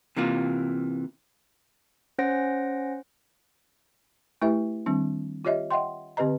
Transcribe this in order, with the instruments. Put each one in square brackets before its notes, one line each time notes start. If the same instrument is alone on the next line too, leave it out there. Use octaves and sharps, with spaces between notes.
[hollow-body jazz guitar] C3 E3 A#3 F4
[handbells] C#4 C5 F#5 A#6 D7
[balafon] A3 E4 G4 B4 E5
D#3 G3 C4 D4
F4 G4 C#5 D#5 E5
D#5 E5 F#5 G5 C6
D3 C4 G4 B4 D#5 A#5